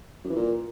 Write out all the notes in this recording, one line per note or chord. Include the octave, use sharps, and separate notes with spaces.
F#2
E3
A#2